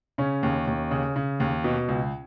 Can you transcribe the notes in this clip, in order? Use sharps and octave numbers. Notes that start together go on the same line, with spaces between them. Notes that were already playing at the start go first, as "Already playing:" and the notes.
C#3 C#4
D#2
D#2
C#3
C#3
D#2
B2
C#2